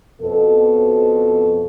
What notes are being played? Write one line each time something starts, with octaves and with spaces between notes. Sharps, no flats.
F2 B2 A4